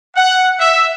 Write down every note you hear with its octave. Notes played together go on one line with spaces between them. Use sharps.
F#5
E5